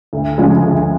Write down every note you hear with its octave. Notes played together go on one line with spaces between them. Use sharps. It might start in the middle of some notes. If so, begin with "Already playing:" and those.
D2
C#3 F3 G#3
D2